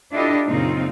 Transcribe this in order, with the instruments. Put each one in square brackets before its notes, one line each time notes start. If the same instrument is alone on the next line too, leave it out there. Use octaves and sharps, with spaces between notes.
[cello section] D4 E4 F4 G4 A4 D#5
F#2 A#2 C#3 C4 D#4 F4